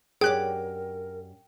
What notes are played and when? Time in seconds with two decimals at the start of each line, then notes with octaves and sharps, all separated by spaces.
0.21 F#2 G4 G#4 A#4 D5 G5 F#6